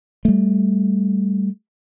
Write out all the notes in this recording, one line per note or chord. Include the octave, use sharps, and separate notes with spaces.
G3 A3